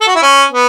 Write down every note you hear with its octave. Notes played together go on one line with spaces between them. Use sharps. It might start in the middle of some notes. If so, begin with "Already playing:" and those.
A4
F#4
E4
C#4
B3